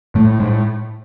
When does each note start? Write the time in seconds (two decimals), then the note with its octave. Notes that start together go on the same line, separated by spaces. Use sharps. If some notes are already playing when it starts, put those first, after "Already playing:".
0.15 A2 A3
0.40 A2 G#3